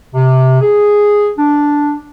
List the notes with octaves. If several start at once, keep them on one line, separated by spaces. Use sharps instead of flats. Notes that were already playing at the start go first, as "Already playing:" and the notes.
C3
G#4
D4